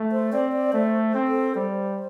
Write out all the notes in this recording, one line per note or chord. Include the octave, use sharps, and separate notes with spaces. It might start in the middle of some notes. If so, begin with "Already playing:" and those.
Already playing: A3
C5
C4 D5
D5
A3 C5
C4
A4
G3 C5